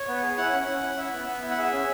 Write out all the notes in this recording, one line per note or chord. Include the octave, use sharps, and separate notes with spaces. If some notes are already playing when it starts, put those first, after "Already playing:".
Already playing: C#5
B3
G#4
E4 F#5
C#4
C#4
E4
E4 E5
B3
B3
E4
F#5
G#4 E5
C#4